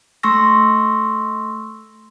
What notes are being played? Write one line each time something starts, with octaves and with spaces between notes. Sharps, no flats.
A3 C6 C#6 E6 A#6